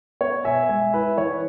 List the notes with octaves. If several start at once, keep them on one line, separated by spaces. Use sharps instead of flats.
B3 C#5
B2 E5 G#5
G#3 E5 G#5
E4 B4 E5
E3 C#5